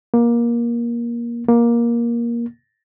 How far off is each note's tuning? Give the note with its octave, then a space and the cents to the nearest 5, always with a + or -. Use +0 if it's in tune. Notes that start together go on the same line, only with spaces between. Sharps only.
A#3 +20
A#3 +15